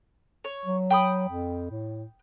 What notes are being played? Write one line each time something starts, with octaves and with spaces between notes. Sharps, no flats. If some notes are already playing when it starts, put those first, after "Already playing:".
C#5
F#3
G5 B5 D#6
F2
A2